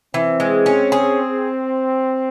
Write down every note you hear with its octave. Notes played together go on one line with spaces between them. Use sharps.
E3 C4
G#3
C#4
G#4